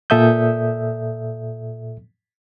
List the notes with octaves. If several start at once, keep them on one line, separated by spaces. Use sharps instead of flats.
A#2 A4 E5 D#6 G6